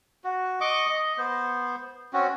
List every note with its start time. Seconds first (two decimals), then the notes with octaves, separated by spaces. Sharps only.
0.24 F#4
0.61 D#5 C#6 D6
0.89 D#5
1.18 B3 C5
2.13 C4 C#4 F#4